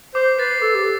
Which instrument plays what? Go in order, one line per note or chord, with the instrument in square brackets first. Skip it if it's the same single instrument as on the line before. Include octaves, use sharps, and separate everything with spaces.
[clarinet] C5 [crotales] D6
[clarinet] B4 [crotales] A6 C7
[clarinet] A4 [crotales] D6
[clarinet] G4